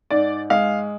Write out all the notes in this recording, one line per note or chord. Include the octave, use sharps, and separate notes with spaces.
G#2 D5
G#3 F5